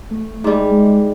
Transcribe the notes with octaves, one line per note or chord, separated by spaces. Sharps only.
A3
G#2 G3
G#3